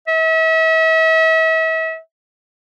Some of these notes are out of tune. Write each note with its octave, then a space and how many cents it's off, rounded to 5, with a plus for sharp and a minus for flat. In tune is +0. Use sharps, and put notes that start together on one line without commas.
E5 -40